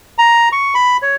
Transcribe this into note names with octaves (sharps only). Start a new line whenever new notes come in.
A#5
C#6
B5
C#5